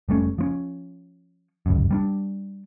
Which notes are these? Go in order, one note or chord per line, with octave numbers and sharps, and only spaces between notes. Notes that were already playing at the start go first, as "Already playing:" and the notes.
F1 G3 A3 C#4
F3 C4 C#4
G1 C#2 F#2
G3 B3 D4